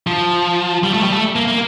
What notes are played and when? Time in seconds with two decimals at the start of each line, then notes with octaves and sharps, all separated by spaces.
0.07 F3
0.84 G3
0.94 A3
1.03 G3
1.13 A3
1.36 A#3
1.48 A#3